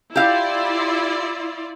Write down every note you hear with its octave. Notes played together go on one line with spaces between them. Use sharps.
E4 F4 G4 D5 F5